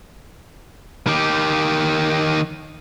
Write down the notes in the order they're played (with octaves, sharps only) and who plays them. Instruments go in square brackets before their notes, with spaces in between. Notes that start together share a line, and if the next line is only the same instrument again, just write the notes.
[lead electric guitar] D#3 G4